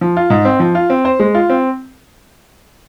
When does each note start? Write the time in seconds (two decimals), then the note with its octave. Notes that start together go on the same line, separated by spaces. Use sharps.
0.01 F3
0.17 F4
0.30 G#2
0.45 C4
0.60 F3
0.75 F4
0.90 C4
1.05 C5
1.20 G#3
1.35 F4
1.49 C4